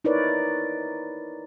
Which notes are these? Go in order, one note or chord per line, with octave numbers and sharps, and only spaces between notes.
D#4 E4 A#4 B4 C#5 D5